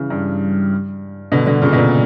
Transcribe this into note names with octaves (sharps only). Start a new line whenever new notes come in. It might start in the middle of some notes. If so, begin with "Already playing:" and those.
Already playing: C#3 E3
G2
B2 D3
B2 D3
A#2 C#3
B2
A#2